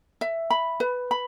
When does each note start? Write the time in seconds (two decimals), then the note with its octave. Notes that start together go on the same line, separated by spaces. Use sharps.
0.21 E5
0.50 B5
0.80 B4
1.11 B5